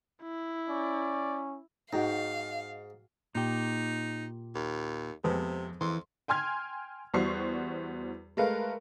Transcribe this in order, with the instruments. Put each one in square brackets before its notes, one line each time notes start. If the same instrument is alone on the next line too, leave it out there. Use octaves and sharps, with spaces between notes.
[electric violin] E4
[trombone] C#4 [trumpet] D5
[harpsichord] G#2 [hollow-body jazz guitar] D#4 [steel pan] F#4 G5 A#5 [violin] F5
[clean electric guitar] A#2 G4 [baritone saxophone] D#4
[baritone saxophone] D#2
[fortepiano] F2 G#3 B3 [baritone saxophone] C3
[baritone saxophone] F2 [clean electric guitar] E3 [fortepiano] C6
[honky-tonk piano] G5 G#5 C6 F6 G#6
E2 G3 F#4 C5 C#6 C7
G#3 A3 A#4 B4 F5